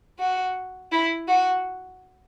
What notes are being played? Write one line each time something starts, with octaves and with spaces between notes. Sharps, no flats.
F#4
E4
F#4